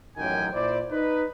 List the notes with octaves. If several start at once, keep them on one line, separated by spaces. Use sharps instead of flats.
A1 F#2 D#3 F#3 G5 G#5
A#2 E4 C5 D5
D#4 B4